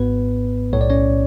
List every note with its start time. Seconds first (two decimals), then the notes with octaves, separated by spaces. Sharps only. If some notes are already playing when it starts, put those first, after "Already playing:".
Already playing: G#1 G#2 B3 B4
0.73 B1 A2 C#5
0.81 D5
0.90 C#4 C#5